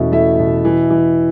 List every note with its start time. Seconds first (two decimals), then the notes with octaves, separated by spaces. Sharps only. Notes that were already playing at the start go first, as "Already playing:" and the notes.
Already playing: E2 B2 A3 C#4 E4 E5
0.12 A3 E4 E5
0.39 B2
0.65 E3
0.90 E3